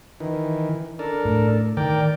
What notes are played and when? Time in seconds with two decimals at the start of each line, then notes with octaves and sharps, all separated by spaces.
0.20 D#3 E3
0.99 D4 A4 A#4
1.25 A2
1.77 D#3 A#4 D5 G5